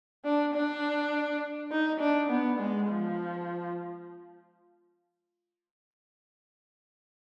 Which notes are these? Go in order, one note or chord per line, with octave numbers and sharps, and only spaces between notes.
D4
D4
D#4
D4
B3
G#3
F3